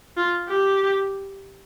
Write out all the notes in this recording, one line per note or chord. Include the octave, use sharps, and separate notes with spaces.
F4
G4